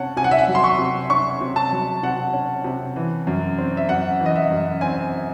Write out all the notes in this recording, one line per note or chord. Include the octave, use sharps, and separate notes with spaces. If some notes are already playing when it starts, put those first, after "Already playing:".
Already playing: C3 C#4 F#5 A5
C3 G#5
F#5
E5
F#5
F#3
C6
C#6
C3
C#4 C#6
C3
A5
F#3
C3 F#5
C#4
C3
E3
F#2
C4
E5
F#2 F#5
E3
D#5
E5
F#2
C4 G#5